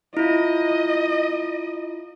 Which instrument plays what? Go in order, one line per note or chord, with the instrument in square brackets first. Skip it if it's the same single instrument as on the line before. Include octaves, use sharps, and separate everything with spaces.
[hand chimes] E4 F4 [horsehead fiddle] D#5